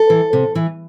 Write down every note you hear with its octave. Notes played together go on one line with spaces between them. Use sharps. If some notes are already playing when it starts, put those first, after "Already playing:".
Already playing: A4
E3
C3
E3